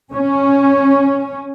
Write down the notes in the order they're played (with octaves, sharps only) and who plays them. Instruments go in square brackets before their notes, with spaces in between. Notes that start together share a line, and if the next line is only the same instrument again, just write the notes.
[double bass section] C#4